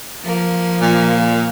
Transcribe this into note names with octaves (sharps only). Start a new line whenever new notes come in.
F3 A#3
A#2